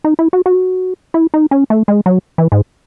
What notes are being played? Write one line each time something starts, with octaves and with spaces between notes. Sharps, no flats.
D#4
E4
F#4
F#4
E4
D#4
C#4
A3
G#3
F#3
E3
G#2